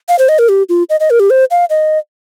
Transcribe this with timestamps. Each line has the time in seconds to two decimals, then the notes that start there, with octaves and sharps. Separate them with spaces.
0.09 F5
0.19 C5
0.29 D#5
0.39 A#4
0.49 G4
0.69 F4
0.89 D#5
1.00 D#5
1.10 A#4
1.20 G4
1.30 C5
1.51 F5
1.70 D#5